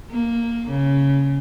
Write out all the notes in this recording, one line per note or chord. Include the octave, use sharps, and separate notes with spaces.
A#3
C#3